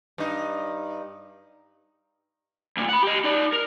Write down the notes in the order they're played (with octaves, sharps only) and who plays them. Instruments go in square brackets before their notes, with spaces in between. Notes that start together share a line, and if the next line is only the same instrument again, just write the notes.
[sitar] G2 D#4
[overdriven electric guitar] D2 A#2
F#5 B5
G4 D#5
D#4 D5
A#4